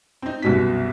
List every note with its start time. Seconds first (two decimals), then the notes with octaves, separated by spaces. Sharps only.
0.22 C4 D#4
0.42 C2 F#2 B2 B6